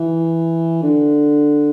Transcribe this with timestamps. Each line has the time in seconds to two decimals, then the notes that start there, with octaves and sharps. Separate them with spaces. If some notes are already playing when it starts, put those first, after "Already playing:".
Already playing: E3
0.83 D3